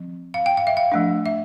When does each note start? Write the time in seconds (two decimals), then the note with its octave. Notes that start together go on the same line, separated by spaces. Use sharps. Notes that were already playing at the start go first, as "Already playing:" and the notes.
Already playing: F3 C4
0.34 F5
0.46 G5
0.57 F5
0.67 E5
0.77 F5
0.92 F3 A3 D4
1.26 E5